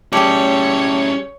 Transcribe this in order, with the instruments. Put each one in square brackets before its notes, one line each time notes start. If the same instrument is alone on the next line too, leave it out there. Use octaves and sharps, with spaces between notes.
[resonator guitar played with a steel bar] G3 G#4 [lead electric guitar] C#4 E4 [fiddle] C#5 [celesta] G5 A5 D6